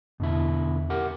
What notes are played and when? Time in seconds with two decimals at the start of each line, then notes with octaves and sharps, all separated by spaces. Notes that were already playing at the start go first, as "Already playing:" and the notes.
0.20 E2 B2 D3 E4
0.90 G4 A#4 F#5